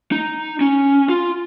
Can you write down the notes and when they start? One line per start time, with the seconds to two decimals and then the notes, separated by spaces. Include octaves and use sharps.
0.12 D#4
0.61 C#4
1.09 F4